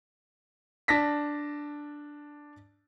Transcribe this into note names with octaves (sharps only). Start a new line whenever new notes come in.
D4 A5 A#6 B6